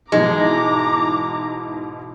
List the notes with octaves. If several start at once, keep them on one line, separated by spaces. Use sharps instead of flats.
G#2 B2 E3 G#3 A#5 D6